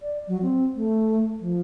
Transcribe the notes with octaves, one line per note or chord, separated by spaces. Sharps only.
D5
F#3
C4
A3
F3